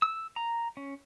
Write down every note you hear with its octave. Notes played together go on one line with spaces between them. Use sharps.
E6
A#5
C#4